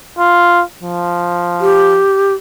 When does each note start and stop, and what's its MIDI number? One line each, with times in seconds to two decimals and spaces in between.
0.19 0.63 65
0.83 2.01 53
1.61 2.34 67